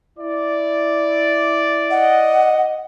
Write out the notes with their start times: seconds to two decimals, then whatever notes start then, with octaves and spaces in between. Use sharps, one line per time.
0.19 E4 D5
1.91 D#5 F#5